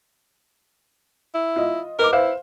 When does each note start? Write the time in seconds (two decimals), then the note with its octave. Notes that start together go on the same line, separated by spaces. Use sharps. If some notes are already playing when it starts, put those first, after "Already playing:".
1.35 E4
1.56 F4 D#5
1.99 A#4 B4 D#5 D6
2.13 E4 B4 C5 F5